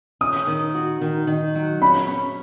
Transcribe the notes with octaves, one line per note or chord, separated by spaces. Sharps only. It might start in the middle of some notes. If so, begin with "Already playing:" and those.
C#4 D#6
D#3
F#4
D#3
D#3
F#3
C#4 B5
C#4